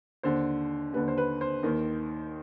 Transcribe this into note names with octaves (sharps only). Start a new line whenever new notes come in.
D#2 D3 C5
D#2 D3 B4
C5
B4
C5
D#2 D#3